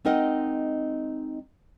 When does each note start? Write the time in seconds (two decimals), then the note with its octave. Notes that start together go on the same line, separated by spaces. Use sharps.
0.05 G#3 C4 D#4 A#4 D#5 F#5